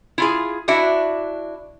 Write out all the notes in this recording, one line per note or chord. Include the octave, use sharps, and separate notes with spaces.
E4 F4 G#4
D4 E4 F#4 E5